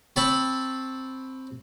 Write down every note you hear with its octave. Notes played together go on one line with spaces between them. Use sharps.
C4 A5 B5 C#6